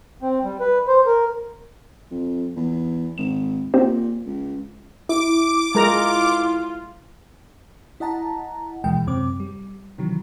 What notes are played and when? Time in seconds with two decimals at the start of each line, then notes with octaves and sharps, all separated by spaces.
0.22 C4
0.44 G3
0.60 B4
0.88 C5
1.06 A#4
2.11 F2
2.56 E2
3.18 G#1 E7
3.74 A#2 C4 G4 C5
4.26 C#2
5.09 E4 D6
5.75 G#3 F4 A#4 A#5
8.00 E4 D#5 F#5 A5 A#5
8.84 D#2 B2 E3 G#3 G5
9.07 F#2 C3 C4 D6
9.40 G3
9.98 C3 D#3 E3 F#3